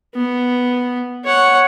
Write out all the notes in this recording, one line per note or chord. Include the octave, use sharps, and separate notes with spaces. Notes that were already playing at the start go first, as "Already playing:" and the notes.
B3
C#5 F#5